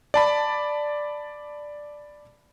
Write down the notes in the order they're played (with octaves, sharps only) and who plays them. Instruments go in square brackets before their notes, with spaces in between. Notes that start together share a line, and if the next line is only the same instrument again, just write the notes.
[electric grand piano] D5 A5 B5